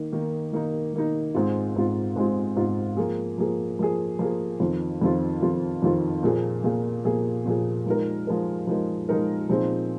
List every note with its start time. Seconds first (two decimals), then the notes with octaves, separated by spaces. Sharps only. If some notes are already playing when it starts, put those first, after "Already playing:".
Already playing: D#3 A#3 D#4
0.12 D#3 A#3 D#4
0.53 D#3 A#3 D#4
0.93 D#3 A#3 D#4
1.35 G#2 G#3 C4 F4
1.76 G#2 G#3 C4 F4
2.16 G#2 G#3 C4 F4
2.56 G#2 G#3 C4 F4
2.97 F3 A#3 G#4
3.38 F3 A#3 G#4
3.79 F3 A#3 G#4
4.19 F3 A#3 G#4
4.60 F2 D#3 C4 F4
5.01 F2 D#3 C4 F4
5.41 F2 D#3 C4 F4
5.82 F2 D#3 C4 F4
6.23 A#2 F3 A#3 G#4
6.64 A#2 F3 A#3 G#4
7.04 A#2 F3 A#3 G#4
7.46 A#2 F3 A#3 G#4
7.86 F3 G#3 D#4 A#4
8.27 F3 G#3 D#4 A#4
8.67 F3 G#3 D#4 A#4
9.09 F3 G#3 D#4 A#4
9.49 A#2 F3 C4 D#4 G#4